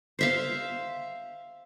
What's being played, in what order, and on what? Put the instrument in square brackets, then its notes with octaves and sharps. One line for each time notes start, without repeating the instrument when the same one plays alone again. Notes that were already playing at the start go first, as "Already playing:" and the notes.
[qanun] C5 E5 F5